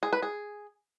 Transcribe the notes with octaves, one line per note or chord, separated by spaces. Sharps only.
G#4
B4
G#4